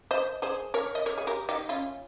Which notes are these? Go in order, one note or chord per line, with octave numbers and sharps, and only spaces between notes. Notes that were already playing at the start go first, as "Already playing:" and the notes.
C5 D#5
G#4 C5
A#4 C#5
D#5
A#4 C#5
G#4
G4 A#4
D#4 G4
C#4 F4